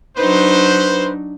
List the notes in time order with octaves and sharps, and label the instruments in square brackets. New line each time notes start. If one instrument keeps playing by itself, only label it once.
[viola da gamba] F#3 D4 D#4 [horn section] B4 C5